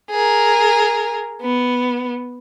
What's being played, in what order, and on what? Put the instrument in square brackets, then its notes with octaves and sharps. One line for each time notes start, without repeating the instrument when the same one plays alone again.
[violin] G#4 A#4
B3